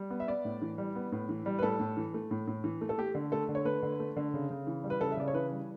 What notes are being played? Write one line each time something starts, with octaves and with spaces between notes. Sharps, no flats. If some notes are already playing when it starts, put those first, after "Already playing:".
Already playing: G3
B3
E5
B3 D5
A2
E3
G3
B3
A2
E3
G3
B4
A2 A4
A2
E3
A3
A2
A2
E3
A3
A4
A3 G4
D3
A3 A4
D3
C#5
A3 B4
D3
A3
D3
C#3
C#3
E3
G3
B4
C#3 A4
E5
C#3 D5
C#5
E3 B4
G3